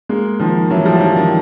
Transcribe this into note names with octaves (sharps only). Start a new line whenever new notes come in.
G#3 A#3
D#3 F3
E3 F#3
F3 G3
F#3
D#3 F3
D#3